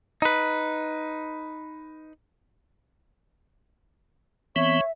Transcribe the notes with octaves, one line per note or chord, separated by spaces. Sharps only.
D#4 B4
E3 B3 C4 C#5 E5